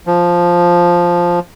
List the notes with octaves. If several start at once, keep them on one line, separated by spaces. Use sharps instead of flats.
F3